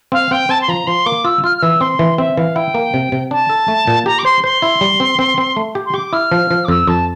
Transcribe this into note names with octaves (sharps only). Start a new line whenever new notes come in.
C4 F5
C4 G5
C4 A5
C6
F3 A#5
F3 C6
A#3 D6
F4 E6
F4 F6
F6
E3 E6
C4 C6
E3
C4 E5
E3 F5
E4 G5
A#3
C3
C3
D4 A5
A4
A3
A#2
G4 A#5
D6
C5 C6
C5 C6
E4
G3
C4
C4
C4
A3
G4
C6
G4 D6
E4 F6
F3
F3
D6
F2 E6
F2 A5